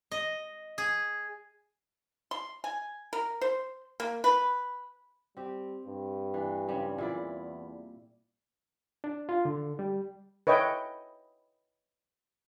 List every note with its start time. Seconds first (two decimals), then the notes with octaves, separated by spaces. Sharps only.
0.11 D#5
0.78 G#4
2.31 C6
2.64 G#5
3.13 A#4
3.41 C5
4.00 A#3
4.24 B4
5.37 G3 C4 G4
5.85 G2
6.34 E3 D4
6.67 C#3 G3 C4
6.98 E2 A#2 E4 D5
9.04 D4
9.29 F4
9.45 D3
9.79 G3
10.47 B4 C#5 D#5 E5 G5